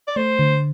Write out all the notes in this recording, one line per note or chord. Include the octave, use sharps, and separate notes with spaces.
D5
A3 C5
D3